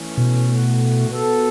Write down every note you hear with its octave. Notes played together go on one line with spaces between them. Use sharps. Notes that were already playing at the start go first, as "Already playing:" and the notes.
Already playing: E3 A3 C#4
B2
A2 A3 F#4
B2 B3 F#4 A4